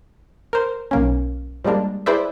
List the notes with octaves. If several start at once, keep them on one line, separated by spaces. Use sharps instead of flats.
A#4 C5
B1 A#3 C#4
F3 G3 G#3 A#3 D4
E4 G#4 B4 C5 D5 E5